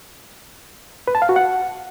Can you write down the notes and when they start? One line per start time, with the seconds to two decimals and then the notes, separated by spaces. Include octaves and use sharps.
1.08 B4
1.15 A5
1.22 F5
1.29 F#4
1.36 F#5